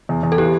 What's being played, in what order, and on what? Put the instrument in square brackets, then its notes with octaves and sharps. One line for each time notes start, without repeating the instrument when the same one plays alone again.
[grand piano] E2
E2
[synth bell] A4
[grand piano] E3 [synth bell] G4